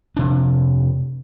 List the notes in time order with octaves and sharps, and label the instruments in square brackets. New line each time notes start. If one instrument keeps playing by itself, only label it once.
[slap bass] F1 C3 D4